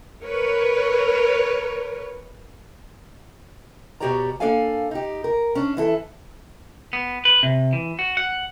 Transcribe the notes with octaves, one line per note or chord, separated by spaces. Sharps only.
A#4 B4 C#5
B2 F#4 G4 C#5 D5 A#5
A#3 D4 A4 D5 F5 G#5
D#4 G4
A#4
C#4 D4
E3 E4 A4
B3
B4
C3
E3
F#4
F#5